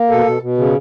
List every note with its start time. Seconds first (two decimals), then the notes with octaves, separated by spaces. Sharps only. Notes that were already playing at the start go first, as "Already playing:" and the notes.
Already playing: A#3
0.10 B2 A4
0.26 B2
0.42 B2
0.58 C#3